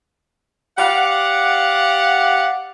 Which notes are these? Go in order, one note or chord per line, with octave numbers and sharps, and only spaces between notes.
G4 D5 F5 F#5